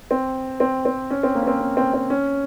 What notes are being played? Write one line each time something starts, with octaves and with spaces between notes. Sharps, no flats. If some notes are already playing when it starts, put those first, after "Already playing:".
C4
C4
C4
C#4
C4
A#3
C#4
C4
C#4
C4
C4
C#4